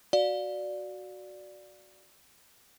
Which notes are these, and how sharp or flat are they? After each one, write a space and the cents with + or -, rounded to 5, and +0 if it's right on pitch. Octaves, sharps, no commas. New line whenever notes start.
F#4 +0 D5 +0 F5 +30